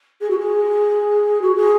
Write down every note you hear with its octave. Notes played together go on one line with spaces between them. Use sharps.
G#4
F#4
G#4
F#4
G#4